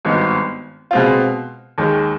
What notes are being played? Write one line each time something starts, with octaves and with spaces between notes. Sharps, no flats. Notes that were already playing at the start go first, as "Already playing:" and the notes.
G#1 G2 D#3 B3 D#4
B2 G#3 C4 F4
D#2 D#3 G#3